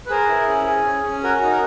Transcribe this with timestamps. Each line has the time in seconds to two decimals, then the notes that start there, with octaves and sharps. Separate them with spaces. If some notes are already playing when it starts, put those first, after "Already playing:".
0.06 B4
0.10 G#4 A#4 C5
0.29 E4
0.49 C#4
0.66 G#4
0.85 C#4
1.04 C#4
1.24 F#4 A#4
1.42 D#4
1.51 A#4